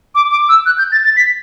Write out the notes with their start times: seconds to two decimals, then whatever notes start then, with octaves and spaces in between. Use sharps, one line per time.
0.15 D6
0.31 D6
0.49 E6
0.66 F#6
0.78 G6
0.92 A6
1.05 A6
1.17 B6